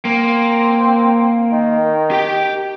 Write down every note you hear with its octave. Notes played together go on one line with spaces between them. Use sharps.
A#3 C4
D#3
G4 G5